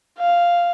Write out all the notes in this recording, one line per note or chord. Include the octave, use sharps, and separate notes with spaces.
F5